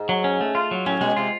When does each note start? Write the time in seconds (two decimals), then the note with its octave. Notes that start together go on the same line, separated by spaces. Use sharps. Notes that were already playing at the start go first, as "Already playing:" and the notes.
Already playing: G#2
0.09 F#3
0.24 C#4
0.41 A3
0.55 F4
0.71 F#3
0.86 A2 C#4
1.01 B2 G#3
1.16 C3 F4